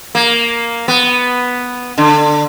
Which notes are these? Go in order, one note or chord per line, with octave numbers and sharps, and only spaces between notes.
A#3
B3
D3